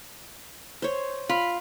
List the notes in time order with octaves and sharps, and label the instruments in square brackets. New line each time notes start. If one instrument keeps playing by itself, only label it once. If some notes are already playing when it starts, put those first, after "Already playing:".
[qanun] C5 C#5
[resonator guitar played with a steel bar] F4 [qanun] B5